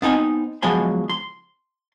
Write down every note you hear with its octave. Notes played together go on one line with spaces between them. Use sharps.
B3 C4 D#4 G#5
F3 F#3 G#3 B3 G#5 C6
C6